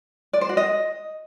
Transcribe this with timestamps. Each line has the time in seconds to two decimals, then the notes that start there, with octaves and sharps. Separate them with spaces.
0.33 D5
0.41 C5
0.49 F#4
0.57 D#5